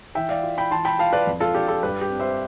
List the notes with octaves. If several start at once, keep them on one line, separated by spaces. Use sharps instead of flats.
E3 E5 G5
D5 F5
F4
G5 B5
E3 A5 C6
G5 B5
F4 F5 A5
B4 D5
F2
F4 A4
D4 G4
F4 A4
G2 G4 B4
G4
C4
C5 E5